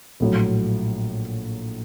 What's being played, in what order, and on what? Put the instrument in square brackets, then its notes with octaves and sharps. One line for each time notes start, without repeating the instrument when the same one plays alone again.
[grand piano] A#1 A2 F#3